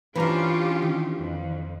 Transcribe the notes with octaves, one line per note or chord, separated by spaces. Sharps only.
E3 C#4 D4 F4 G4 B4 C5 A#5
D#3
F2